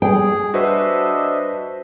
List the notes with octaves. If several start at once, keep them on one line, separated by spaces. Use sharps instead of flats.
G3 G#4 G5
D4 F#4 B4 C5 D#5 E5